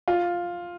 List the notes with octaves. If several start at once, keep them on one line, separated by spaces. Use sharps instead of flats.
F4